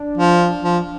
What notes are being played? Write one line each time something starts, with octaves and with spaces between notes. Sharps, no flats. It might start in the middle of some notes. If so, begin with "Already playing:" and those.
Already playing: D4
F3
F3